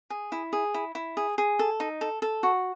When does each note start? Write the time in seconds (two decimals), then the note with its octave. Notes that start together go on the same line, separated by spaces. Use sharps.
0.10 G#4
0.32 E4
0.53 G#4
0.74 E4
0.95 E4
1.17 G#4
1.38 G#4
1.59 A4
1.80 D#4
2.01 A4
2.22 A4
2.43 F#4